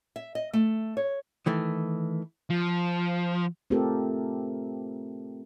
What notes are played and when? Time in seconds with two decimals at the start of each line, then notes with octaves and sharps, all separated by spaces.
0.16 E5
0.35 D#5
0.53 A3
0.97 C#5
1.46 D#3 E3 A3
2.50 F3
3.70 A3 C4 F4 G4 A4 A#4